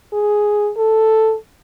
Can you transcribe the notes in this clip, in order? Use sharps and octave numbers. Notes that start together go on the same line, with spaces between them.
G#4
A4